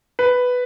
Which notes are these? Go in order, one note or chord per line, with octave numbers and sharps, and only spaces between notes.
B4